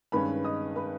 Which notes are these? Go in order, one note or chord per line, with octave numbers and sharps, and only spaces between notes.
G2 D#3 G#3 C#4 B4 B5
D#5 D#6
B4 B5